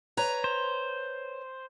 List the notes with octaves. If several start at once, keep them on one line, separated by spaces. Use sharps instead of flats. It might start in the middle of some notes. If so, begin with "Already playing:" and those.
B4 C#5 A#5
C5